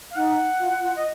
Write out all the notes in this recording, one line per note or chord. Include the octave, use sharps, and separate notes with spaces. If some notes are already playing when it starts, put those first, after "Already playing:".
F5
D#4 F#5
F4
F4
D#5